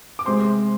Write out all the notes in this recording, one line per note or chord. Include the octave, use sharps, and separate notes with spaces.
D6
C3 G#3 C5 C6